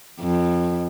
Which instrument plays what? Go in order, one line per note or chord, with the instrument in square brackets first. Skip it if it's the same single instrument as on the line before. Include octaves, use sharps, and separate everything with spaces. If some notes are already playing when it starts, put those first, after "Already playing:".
[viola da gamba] F2